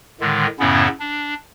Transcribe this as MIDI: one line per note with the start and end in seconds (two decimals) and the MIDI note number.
0.21 0.47 45
0.21 0.47 50
0.21 0.47 51
0.21 0.47 56
0.60 0.88 42
0.60 0.88 45
0.60 0.88 49
0.60 0.88 59
0.60 0.88 61
0.60 0.88 64
1.00 1.34 62